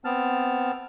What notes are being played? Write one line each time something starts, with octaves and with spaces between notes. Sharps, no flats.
B3 C4 A5 F6